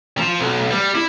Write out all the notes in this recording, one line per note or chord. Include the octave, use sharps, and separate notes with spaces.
F3
B1
G3
E4